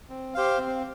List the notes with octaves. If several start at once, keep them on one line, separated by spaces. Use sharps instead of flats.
C4
G4 C5 F5
C4